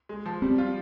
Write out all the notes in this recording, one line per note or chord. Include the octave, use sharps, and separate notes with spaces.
G#3
F3
G3 C4
F4